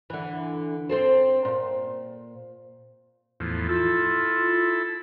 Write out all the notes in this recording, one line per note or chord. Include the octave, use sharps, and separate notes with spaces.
D3 E3
C4 A4 C5
A#2
E2 A2 F3
E4 F4 A4